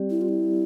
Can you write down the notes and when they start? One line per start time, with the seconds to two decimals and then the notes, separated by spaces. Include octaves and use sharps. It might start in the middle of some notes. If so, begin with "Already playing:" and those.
Already playing: G3 C4 G4 D5
0.10 E4
0.21 F4
0.29 E4